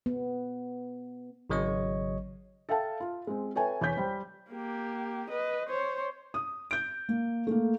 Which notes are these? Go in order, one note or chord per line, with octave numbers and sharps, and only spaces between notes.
B3
G#1 C#3 F#3 C#5 D#5 C#6
A4 E5 F5 G5 A5
F4
G#3 C4
A4 B4 C#5 E5 G5 G#5
E2 C#5 G#5 G6 B6
G3 C5 G5
A#3 G4
B4 D#5
C5 C#5
D#6
G6 D7
A#3
A3 A#3